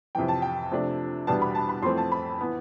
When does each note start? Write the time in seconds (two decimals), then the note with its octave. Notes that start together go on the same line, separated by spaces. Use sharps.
0.15 F2 C3 E3 G5
0.28 A5
0.42 G5
0.71 C3 F3 A3 D4
1.27 E2 B2 G3 B3 D4 A5
1.42 B5
1.55 A5
1.69 B5
1.83 F2 E3 A3 C4 C6
1.97 A5
2.12 B5
2.41 E3 B3